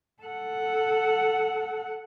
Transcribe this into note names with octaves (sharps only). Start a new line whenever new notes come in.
A4 F#5